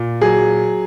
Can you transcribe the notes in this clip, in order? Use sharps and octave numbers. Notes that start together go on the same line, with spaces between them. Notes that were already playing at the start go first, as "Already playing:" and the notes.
Already playing: A#2
F#3 G#4